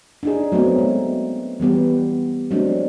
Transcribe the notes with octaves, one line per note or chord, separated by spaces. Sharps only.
D4 D#4 G#4
F#3 A3 B3 C4
G#3
E3 G3 B3 G4
F#3 G#3 A3 C4 D4